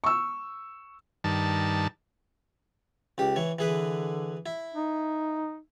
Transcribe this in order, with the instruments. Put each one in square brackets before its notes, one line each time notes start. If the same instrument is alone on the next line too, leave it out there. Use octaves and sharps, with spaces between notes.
[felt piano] C#6 E6
[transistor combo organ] G2 D#3 A5
[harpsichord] C#2 G4
E3 C#5
[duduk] D3 [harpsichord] E3 G#4 B4
[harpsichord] E4
[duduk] D#4